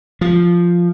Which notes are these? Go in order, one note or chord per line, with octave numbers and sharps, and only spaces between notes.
F3